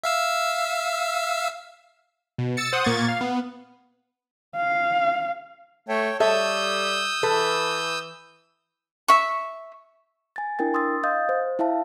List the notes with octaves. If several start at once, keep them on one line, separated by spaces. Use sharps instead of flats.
E5 F5 E6
B2
E6 A6 C#7
C5 F#5 D#6
A#2 A#3 C#6 G#6 A6
F5
B3
F5
A3 C#5 G5
G3 A4 C#5 E5 D#6 E6 G6
E3 A4 B4
E5 C#6
G#5 A6
D4 E4 A#4 G5 A6
C6 D#6 E6 A6
D#5 F5 D#6 G6 A6
C5
E4 E5 F5 A5